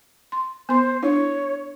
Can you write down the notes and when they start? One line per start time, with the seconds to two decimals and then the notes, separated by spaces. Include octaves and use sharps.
0.32 C6
0.69 B3 C5 C6
1.03 D4 E4 C#5